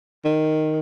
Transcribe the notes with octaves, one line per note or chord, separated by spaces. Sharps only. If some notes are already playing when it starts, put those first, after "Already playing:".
D#3